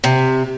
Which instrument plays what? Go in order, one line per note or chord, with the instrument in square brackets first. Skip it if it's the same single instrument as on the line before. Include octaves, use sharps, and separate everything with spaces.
[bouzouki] C3